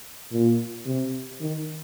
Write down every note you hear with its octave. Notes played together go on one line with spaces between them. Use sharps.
A#2
C3
D#3